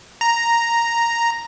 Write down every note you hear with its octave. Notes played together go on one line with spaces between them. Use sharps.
A#5